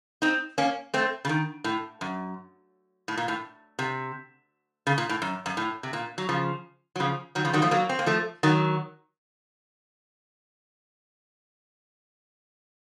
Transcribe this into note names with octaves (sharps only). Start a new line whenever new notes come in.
C4 D#4
A#3 C#4
A3 C4
C#3
D#3
A2
F#2
A2
A#2
A2
C3
C#3
A#2
A2
F#2
F#2
A2
C3
A#2
F#3
C#3 F3
F#3
C#3 F3
D#3 F#3
C#3 F3
D#3 F#3
F3 A3
F#3 A#3
C4
A#3
F3 A3
D#3 F#3